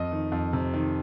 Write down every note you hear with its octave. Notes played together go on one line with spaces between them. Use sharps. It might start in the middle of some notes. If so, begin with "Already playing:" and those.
Already playing: F2 D#5
D#3
F2
C3
D#3